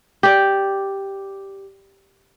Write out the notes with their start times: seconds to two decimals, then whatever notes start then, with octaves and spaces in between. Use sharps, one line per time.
0.23 G4 D5